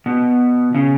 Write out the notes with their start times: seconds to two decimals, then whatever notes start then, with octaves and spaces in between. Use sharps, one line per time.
0.06 B2
0.74 C#3